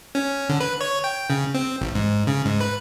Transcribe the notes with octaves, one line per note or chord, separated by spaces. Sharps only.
C#4
D3
B4
C#5
G5
C#3
C4
A1
G#2
C#3
G#2
B4